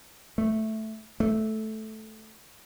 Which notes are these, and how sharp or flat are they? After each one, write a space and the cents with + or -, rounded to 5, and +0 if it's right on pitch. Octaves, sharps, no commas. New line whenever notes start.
A3 -5
A3 -10